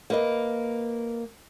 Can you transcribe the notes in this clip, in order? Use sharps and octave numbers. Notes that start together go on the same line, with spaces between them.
A#3 B4 D#5